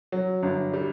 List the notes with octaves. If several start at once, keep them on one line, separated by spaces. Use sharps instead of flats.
F#3
G1
G3